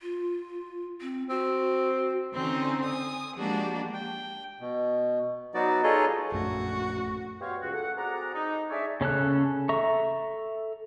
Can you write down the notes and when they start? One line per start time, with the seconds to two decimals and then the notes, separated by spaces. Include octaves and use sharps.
0.02 F4
1.01 C4
1.30 C4 F#4
2.33 D3 C4 C#4 D#4
2.84 G#5 D#6
3.34 F3 G#3 A#3 D4 F#4 G4
3.94 G5
4.60 B2
5.54 F#3 B3 D#4 F#4 D5
5.83 D#4 F4 G#4 A4 C#5 D#5
6.32 A#1 F#2 A3 F#4
7.41 B3 F#4 G4 C5 C#5 F5
7.62 C#2 F#4
7.74 A3 F#5
7.97 C4 F#4 G#4 D5 F#5 A#5
8.35 D#4
8.70 A3 D4 G#4 C#5 D5 E5
9.01 C#3 C#4 A4 F#6
9.69 A4 E5 A#5 C#6